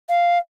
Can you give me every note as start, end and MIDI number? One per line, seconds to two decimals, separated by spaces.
0.09 0.38 77